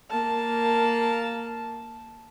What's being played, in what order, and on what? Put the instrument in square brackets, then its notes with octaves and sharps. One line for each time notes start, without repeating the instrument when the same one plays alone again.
[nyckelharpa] A#3 A5